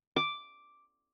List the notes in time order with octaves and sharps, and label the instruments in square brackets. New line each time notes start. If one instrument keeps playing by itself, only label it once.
[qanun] D6